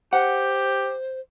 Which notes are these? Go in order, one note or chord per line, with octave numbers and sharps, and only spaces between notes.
G4 C5 F#5